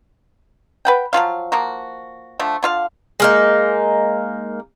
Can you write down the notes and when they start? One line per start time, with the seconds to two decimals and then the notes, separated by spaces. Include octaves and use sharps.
0.85 B4 F#5 G5
1.13 F3 F#3 F4 F5
1.52 F3 A#3 F#4
2.39 D3 F3 A3
2.63 D3 F4 F5
3.20 G#3 A#3 D#4